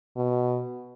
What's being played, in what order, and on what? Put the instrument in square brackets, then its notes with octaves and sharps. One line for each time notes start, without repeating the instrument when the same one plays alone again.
[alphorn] B2